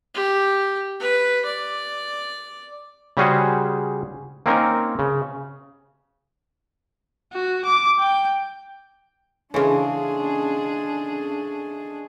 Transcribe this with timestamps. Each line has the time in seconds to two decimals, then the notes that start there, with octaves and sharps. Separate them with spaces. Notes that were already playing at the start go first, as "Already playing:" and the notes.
0.14 G4
1.00 B4
1.45 D5
3.17 C#3 G3 C#4 F#4 G#4 C5
4.46 A#3 C4 C#4 D#4 A#4
4.99 C#3
7.33 F#4
7.65 D6
8.00 G5
9.54 C#3 E3 G#3 A3 C#4 D4 G#4 F5